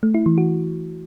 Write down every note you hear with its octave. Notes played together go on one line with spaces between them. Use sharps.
A3
E4
E3
F#4